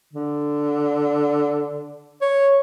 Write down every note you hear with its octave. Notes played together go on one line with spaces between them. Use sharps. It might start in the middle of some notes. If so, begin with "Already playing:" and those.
D3
C#5